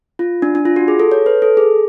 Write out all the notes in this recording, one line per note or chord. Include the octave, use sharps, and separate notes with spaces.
F4
D4
D4
F4
F#4
G#4
A4
C#5
B4
A4
G#4